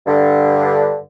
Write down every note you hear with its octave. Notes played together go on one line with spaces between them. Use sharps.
G2 D3